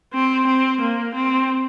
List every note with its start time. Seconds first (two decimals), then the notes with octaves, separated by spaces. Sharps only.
0.13 C4
0.47 C4
0.81 A#3
1.15 C4